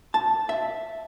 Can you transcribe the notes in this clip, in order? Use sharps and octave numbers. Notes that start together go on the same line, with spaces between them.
A5
E5